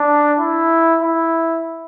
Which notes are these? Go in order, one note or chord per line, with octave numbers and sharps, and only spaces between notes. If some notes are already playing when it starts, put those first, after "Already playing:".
Already playing: D4
E4
E4